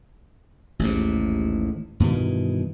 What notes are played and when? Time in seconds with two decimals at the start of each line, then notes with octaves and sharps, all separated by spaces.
0.79 A1 D#2 G#2
2.00 G2 B2 D#3 E3